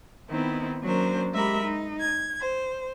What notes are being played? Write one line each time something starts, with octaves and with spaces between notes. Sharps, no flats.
D#3 B3 C4 D#4 E4
F#3 A#3 C#4 D4 A#4 C5
G#3 G4 A#4 E5 A#5 B5
D#4
G#6
C5